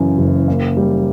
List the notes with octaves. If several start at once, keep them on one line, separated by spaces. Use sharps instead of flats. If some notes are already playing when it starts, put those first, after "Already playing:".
Already playing: F#2 C#3 E3
F#1
A#3
G3